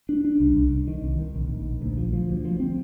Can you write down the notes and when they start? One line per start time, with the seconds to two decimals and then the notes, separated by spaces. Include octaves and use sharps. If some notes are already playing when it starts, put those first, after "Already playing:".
0.09 D4
0.25 D4
0.40 C2
0.56 C2
0.72 C2
0.88 D#3
1.04 C2
1.19 D#3
1.34 A#1
1.50 A#1
1.66 A#1
1.82 D2
1.98 F3
2.13 F3
2.29 D2
2.45 F3
2.60 C4